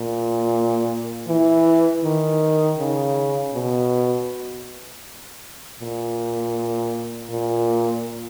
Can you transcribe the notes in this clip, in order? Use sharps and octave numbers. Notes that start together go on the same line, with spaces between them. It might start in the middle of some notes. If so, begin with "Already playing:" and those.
Already playing: A#2
E3
D#3
C#3
B2
A#2
A#2